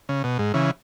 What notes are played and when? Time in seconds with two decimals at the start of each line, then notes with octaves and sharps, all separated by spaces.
0.09 C#3
0.24 B2
0.39 G#2
0.54 C#3 E3